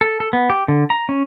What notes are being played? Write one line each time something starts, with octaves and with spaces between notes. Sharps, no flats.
A4
A4
B3
G4
D3
A#5
C#4